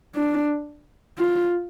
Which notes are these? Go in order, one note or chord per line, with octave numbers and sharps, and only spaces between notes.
D4
F4